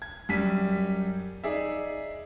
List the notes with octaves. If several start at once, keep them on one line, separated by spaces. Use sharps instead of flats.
G#6
F#2 G3 B6 D#7
D#4 G#4 D5 E5